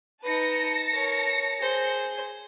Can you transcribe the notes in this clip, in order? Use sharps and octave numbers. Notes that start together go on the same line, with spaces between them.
D#4 B4 A5 A#6 C#7
A#4 C#5
G#4 C5